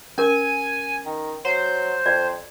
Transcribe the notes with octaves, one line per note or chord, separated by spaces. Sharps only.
C#4 A#4 G#5
D#3
F#3 C5
F2 D5